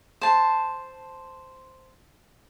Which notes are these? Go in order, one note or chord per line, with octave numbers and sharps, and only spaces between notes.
C5 A5